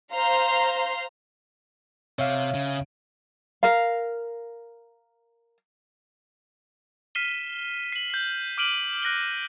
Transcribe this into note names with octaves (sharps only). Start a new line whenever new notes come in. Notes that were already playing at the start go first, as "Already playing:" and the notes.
C5 F5 A#5 C6
C3 C#5 E5 F5
C#3
A#4 F5
F6 B6 C7 D#7 E7 G7
C7 F#7
G6 C7
D6 F6 D7 D#7 F#7 G7
F#6 A#6 D7 G7